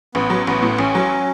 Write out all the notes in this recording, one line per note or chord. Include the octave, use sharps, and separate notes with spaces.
A1 B3
F#3
A1 B3
A2
A1 C#4
F#3